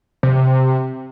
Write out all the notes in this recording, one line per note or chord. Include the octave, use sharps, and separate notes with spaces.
C3